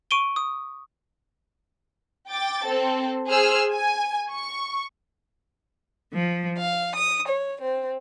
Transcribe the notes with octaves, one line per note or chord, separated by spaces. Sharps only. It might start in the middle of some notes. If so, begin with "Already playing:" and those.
C#6 D7 D#7 G7
D#6
G5 D6 A6
C4 A4
G#4 C5 E6 F6
G#5
C#6
F3
F5
D#6
C#5
C4